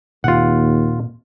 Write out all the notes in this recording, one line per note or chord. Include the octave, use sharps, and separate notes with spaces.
D#2 A#2 C4 F4 F#5